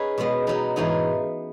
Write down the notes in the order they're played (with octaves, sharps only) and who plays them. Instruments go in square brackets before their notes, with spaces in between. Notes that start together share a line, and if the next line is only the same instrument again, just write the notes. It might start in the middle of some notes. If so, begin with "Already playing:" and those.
Already playing: [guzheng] C#4 D#4 G#4 B4 C#5
B2 G#3 B3
F#3 B3 D#4
G#2 E3 B3 D#4 G#4